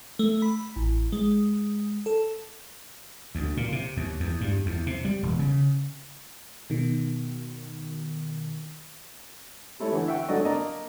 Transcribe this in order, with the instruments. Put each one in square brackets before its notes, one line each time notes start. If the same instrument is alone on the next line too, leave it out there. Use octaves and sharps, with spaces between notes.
[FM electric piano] A3
B5
A1
G#3
A4
[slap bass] D2
A#2
C3
D#2
E2
G2
E2
C3
G3
E1
C#3
[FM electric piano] B2 D#3
[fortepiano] G3 A3 E4 C#5
D3 E3
E5 F#5 G5 C#6
D3 F#3 A4 D5 D#5 C#6
A#3 D4 A#4 D5 D#5 A#5